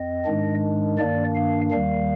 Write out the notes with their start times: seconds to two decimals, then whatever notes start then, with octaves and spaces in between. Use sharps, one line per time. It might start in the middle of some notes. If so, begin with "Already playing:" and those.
Already playing: F2 C4 D#5
0.25 G#2 D#3 G#3 D4
0.98 G2 D#3 A#3 D4 D5
1.35 F5
1.71 D#2 D#3 G3 F5